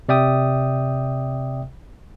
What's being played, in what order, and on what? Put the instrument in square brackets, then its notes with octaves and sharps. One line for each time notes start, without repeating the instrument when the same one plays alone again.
[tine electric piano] C3 D5 E5 G5 D#6